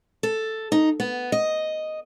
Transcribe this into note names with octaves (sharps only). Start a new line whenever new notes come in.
A4
D#4
B3
D#5